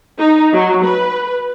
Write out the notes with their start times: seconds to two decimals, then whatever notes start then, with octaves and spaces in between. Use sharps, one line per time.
0.18 D#4
0.52 F#3
0.84 B4